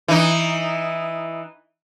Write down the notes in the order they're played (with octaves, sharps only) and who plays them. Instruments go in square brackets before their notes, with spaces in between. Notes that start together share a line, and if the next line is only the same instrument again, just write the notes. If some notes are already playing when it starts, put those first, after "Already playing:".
[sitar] E3 D#4